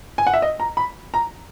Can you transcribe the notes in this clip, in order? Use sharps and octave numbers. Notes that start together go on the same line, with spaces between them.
G#5
F#5
E5
D#5
A#5
B5
A#5